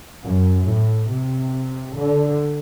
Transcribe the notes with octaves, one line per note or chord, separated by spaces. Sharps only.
F#2
A2
C3
D3